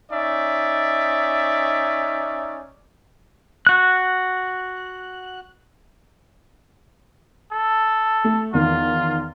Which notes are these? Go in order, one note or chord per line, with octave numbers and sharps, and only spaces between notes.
C#4 D#4 D5 E5
F#4 F#6
A4
A3
E2 D#3 F4